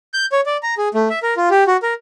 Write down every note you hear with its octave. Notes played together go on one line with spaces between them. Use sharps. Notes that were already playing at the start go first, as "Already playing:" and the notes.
G6
C#5
D5
A#5
G#4
A3
E5
A#4
F4
G4
F#4
A#4